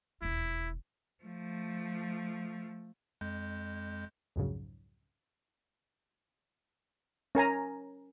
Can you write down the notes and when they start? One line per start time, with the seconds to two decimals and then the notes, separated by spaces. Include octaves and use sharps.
0.22 E1 D#2 E4
1.24 F3 A3
3.21 F2 G#3 G6
4.36 C2 F2 G#2 C#3 F#3
7.35 C#4 A#4 G#5 A#5